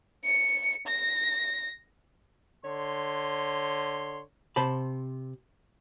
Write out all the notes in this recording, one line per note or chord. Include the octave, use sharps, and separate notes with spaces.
C#7
A#6
D3 C#5 C6
C3 C5 A5 B5